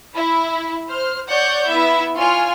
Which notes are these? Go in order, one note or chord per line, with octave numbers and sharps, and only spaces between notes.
E4
C5 F6
C#5 D5 F#5 G6
B3 E4 E5
F4 C#5 G#5 C6 F6